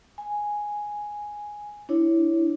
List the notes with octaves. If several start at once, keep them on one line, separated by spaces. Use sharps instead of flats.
G#5
D4 E4 C#5